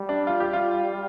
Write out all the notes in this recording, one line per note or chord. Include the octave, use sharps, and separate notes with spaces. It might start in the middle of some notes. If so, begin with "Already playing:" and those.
Already playing: G3
D4
F4
G4
F4